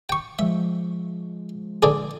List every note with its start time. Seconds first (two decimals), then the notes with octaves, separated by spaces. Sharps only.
0.09 G5 C#6
0.39 F3 G#3 E5
1.83 D3 D4 G#4